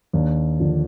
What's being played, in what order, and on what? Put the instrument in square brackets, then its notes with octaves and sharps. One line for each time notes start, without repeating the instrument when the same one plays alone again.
[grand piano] D#2 D4
D3 F3